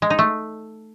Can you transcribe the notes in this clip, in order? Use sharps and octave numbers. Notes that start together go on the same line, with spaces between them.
G#3
D#4
A3